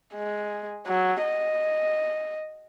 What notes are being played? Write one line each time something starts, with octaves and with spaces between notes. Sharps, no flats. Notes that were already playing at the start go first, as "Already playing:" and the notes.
G#3
F#3
D#5